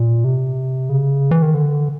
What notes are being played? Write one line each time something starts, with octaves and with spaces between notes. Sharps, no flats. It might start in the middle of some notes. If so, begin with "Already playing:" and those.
Already playing: A#2
C3
C#3
E3
D#3
D3